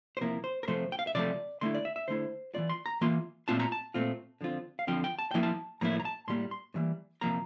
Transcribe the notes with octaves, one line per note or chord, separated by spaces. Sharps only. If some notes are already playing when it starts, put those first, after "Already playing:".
C5
C3 F3 A#3 E4 A#4
C5
A#4
C3 F3 A3 C5
G5
F5
E5
C3 F3 A3 D5
D3 A3 E4 C6
D5
E5
E5
D3 A3 E4 C5
E3 A#3 F4 D5
C6
A#5
E3 A#3 F4 C6
A#2 A3 C4 F4 A5
A#5
A5
A#2 A3 C4 F4
D3 F3 C4 F4
F5
D3 F3 C4 F4 G5
G5
A5
A2 F3 A#3 E4 G5
A5
A2 F3 A#3 E4 A#5
A#5
A5
A2 E3 G3 A#3 C6
C6
A2 E3 G3 A#3
C3 F3 A#3 A#5